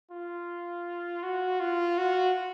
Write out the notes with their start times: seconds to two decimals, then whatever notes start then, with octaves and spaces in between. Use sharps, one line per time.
0.11 F4
1.23 F#4
1.60 F4
1.98 F#4